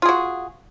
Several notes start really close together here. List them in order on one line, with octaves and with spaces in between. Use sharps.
F4 G#4 F#4